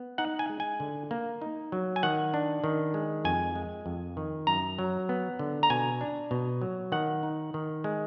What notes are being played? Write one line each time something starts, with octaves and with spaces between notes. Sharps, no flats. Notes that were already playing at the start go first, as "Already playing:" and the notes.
Already playing: B3
D#4 F#5
G#5
G#3
G#5
D3
A#3
D#4
F#3
G#5
D#3 F#5
D4
D#3
G#3
F2 G#5
G#3
F2
D#3
F#2 A#5
F#3
B3
D3
A#5
B2 G#5
D4
B2
F#3
D#3 F#5
D#4
D#3
G#3